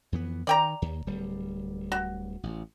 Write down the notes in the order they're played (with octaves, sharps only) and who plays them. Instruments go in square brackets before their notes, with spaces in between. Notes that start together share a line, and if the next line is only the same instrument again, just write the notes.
[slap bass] F2 E3 B3
[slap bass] D#3 [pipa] D5 G5 A#5
[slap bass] D#2
D1 G3
[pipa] F#4
[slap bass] A1